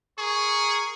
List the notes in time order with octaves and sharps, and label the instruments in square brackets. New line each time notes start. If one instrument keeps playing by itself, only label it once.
[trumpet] G#4 [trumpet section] A#4 C#6